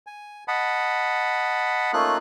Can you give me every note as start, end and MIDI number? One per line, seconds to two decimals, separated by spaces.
0.07 0.44 80
0.48 1.91 75
0.48 1.91 78
0.48 1.91 81
0.48 1.91 83
1.93 2.17 57
1.93 2.17 58
1.93 2.17 61
1.93 2.17 63
1.93 2.17 65
1.93 2.17 90